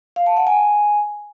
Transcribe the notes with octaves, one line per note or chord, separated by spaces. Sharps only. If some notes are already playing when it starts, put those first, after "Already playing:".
F5
A5
F#5
G#5